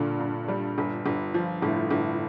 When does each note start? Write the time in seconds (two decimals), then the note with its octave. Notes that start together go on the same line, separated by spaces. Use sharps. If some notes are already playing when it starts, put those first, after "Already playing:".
Already playing: G2 A#2 D3
0.20 G2
0.48 G3
0.78 G1
1.06 G1
1.34 F3
1.62 G1 A2
1.91 G1